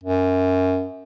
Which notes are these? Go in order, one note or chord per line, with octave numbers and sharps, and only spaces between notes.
F#2